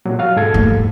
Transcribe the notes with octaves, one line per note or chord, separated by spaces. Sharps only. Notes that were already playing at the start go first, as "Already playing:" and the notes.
A#2 F#3 A#3
F#4 F5 F6
G#2 A4 G#6
D#2 A2